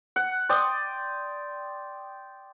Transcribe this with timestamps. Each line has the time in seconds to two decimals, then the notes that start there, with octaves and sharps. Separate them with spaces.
0.16 F#5
0.49 D5 G5 C6 D#6